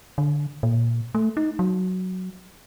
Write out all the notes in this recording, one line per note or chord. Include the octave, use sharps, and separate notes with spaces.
D3
A#2
A3
D#4
F#3